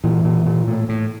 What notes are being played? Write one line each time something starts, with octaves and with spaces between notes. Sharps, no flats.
A#2 E3
A#2
A#2
A2
A2